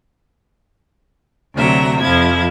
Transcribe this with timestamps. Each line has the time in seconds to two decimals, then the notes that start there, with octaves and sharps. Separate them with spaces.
1.55 D2 C3 F#3 E5 A#5
2.00 F2 F3 E4 G#6